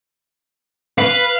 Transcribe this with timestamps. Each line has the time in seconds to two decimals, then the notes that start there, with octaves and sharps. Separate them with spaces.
0.98 B4 F5